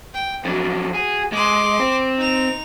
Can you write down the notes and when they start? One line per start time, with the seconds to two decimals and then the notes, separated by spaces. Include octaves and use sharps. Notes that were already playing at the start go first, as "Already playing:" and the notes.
0.14 G5
0.45 F2 F#3 D4
0.94 F#4 G#4
1.32 G#3 C6 D6
1.80 C4
2.18 D#4 F7